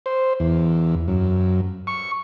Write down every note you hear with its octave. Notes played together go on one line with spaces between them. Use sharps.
C5
E2
F#2
C#6